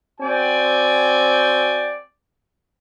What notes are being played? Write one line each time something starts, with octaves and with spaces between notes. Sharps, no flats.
C4 F#4 D5 G5 G#5